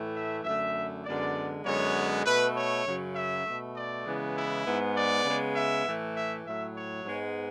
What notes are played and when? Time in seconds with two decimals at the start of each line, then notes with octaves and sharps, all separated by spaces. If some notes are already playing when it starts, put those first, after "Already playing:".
Already playing: A2 E3 A3
0.15 E5
0.44 F#2 D3 A3 E5
1.04 F#2 D3 G#3 B3 D5
1.64 F#2 D3 G#3 B3 C#5
2.25 B2 A3 B4
2.55 C#5
2.85 F#2 C#3 F#3
3.14 E5
3.45 B2 A3
3.75 D5
4.05 C#3 E3 G#3 B3
4.35 E4
4.65 G#2 G#3 B3
4.95 D5
5.25 C#3 G#3 B3
5.54 E5
5.85 A2 E3 A3
6.15 E5
6.45 A2 F#3 A3 E5
6.75 C#5
7.05 G#2 G#3 B3